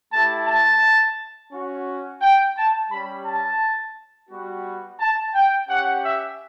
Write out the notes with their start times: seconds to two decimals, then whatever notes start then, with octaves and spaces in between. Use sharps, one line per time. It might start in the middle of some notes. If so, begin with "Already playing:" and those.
0.12 A3 E4 G4 A5
0.47 A5
1.52 C#4 F#4
2.22 G5
2.57 A5
2.91 G3 C#4 G4 B5
3.26 A5
4.30 G3 B3 F#4
5.00 A5
5.35 G5
5.69 C#4 G4 F#5
6.04 E5